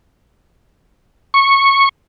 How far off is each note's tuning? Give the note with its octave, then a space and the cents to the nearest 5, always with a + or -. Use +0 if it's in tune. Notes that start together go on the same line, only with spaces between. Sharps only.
C#6 -10